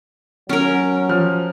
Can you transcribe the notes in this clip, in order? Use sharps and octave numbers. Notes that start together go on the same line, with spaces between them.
F#3 C#4 A#4
F3 F6